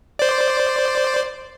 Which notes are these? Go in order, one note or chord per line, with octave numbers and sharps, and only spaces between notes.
C5 D5